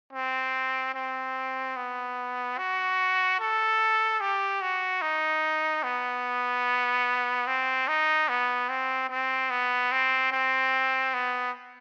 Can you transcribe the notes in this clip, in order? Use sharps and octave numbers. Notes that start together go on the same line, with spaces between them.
C4
C4
B3
F#4
A4
G4
F#4
D#4
B3
C4
D#4
B3
C4
C4
B3
C4
C4
B3